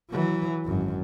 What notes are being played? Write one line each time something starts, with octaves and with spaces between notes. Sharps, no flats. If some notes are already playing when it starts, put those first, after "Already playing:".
E3 F#3
G#1 F#2